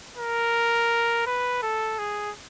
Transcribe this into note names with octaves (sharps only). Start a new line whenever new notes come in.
A#4
B4
A4
G#4